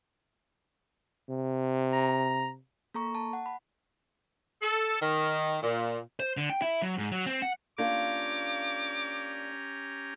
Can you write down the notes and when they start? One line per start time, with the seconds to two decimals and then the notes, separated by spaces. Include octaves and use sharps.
1.29 C3
1.93 A#5
2.94 A#3 A4 A#5 C#6
3.15 A5
3.33 F#5
3.46 B5
4.62 A4
5.01 D#3
5.63 A#2
6.20 C5
6.37 D3
6.50 G5
6.62 E4
6.82 F#3
6.98 G#2
7.11 F#3
7.26 C4
7.42 F#5
7.78 A#3 C#4 D4 F4 G4 A#5 D6